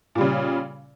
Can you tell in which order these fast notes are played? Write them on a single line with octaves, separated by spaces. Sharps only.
A#2 G3 C#3